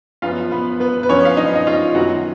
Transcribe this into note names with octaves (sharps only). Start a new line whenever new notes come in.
F#2 F3 B3 F4 F5
B3 B4
B3 B4
B4
F#2 F3 B3 C#4 C#5
F5
D#4 D#5
D#5
F4 F5
F#2 D#3 F#3 B3 F#4 F#5